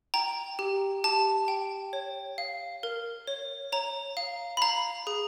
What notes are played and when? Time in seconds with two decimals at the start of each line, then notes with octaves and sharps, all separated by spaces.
0.14 G5 A#5
0.59 G4
1.04 G4 A5
1.48 G5
1.93 C#5
2.38 F5
2.83 A#4
3.27 C#5
3.72 C#5 A#5
4.17 F5
4.57 B5
4.62 F5 A#5
5.07 G#4